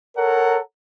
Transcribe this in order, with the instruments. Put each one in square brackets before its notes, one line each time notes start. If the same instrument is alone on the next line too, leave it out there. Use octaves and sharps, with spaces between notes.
[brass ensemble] A4 A#4 C#5 F#5 A#5